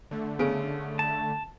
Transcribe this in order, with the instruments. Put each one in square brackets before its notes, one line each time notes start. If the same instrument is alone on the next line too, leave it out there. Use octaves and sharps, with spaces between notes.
[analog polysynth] D3 A3
[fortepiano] C#3 [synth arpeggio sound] B3 G#4 D7
[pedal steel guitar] A5